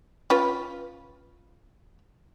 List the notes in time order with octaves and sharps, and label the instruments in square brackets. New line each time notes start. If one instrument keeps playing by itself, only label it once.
[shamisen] C#4 F4 B4